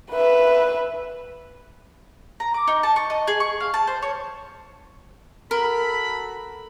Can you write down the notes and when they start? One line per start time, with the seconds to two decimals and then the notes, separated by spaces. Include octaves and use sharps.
0.11 B4 E5
2.40 A#5
2.54 D6
2.67 D#4
2.83 A5
2.96 C#6
3.10 D#5
3.28 G#4
3.40 C#6
3.60 F5
3.74 A5
3.87 C5
4.02 C#5
5.51 F#4 A4 A#4 B5